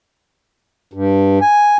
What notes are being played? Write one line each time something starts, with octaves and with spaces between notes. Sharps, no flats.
G2
G#5